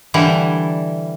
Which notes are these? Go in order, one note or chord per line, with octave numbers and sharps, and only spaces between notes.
D3 E3 G3 E4